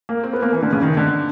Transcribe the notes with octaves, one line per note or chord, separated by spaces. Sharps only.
A#3
C4
B3
A#3
E3
D3
C#3
D#3
D3